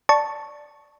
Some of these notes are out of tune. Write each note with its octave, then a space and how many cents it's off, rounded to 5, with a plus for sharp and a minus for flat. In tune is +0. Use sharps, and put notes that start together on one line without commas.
D5 +5 A5 +0 C#6 +0